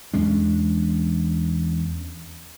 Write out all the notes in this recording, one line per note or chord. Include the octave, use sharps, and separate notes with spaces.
E2 G#3 C#4 D4